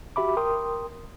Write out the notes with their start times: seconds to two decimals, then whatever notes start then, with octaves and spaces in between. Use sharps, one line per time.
0.16 F#4 G4 E5 B5 D6
0.37 A#4 G5 C6 D#6